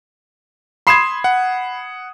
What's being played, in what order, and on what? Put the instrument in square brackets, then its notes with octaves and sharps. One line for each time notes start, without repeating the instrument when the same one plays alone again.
[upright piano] B5 C7 E7 [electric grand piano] C6 D#6 G#6
[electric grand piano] F#5